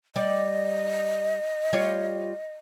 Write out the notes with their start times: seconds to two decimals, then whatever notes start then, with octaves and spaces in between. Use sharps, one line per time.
0.16 G3 D5 D#5
1.73 G3 F4 C#5